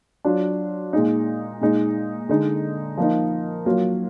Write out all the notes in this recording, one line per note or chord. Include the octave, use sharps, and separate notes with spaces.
F#3 D4 F4
A#2 G#3 D#4
A#2 G#3 D#4
D3 G#3 D#4
F3 A#3 D#4
F#3 A#3 F4